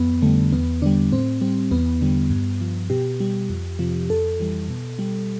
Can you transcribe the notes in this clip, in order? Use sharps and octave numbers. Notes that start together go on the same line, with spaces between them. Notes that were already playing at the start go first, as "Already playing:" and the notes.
Already playing: F2 B3
D3 G3 A3
E2 B3
D3 G3 D4
A2 C4
G3 C4
E2 B3
D3 G3
G2
F3
B2 G4
G3
F2
C3 F3
F2 A4
E3 G3
B2
G3